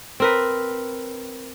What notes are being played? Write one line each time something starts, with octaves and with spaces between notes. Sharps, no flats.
C4 A#4 B4